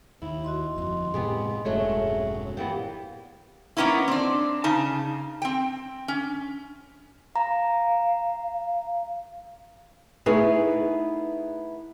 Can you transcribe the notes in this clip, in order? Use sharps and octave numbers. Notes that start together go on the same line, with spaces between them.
D#2 E4
F#4 D#5 C6
G1 F2 D#5 C6
A2 C3 G#3 B3 G4 G#4
E1 G2 F#3 G#3 A3 C#4 G#4 E5
A#2 E3 B3 G4 F5 G5
A#3 B3 C#4 D#4 E4
C4 D4
C#3 D#4 A5
C4 G5
C#4
F5 A#5
A3 B3 D#4 E4 G#4 B4